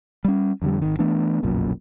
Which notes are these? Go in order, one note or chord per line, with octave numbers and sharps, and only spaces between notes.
G3 C#4
F2 D3 G3
G#1 D#3
E3 A3 B3 D4
F1 B1 F#2 A#2